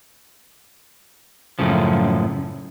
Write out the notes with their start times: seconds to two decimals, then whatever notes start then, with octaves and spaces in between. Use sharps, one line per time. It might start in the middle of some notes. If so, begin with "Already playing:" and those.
1.59 F#2 A2 C#3 F3